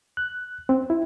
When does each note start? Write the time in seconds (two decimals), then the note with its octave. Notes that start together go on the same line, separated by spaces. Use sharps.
0.17 F#6
0.69 C4
0.90 E4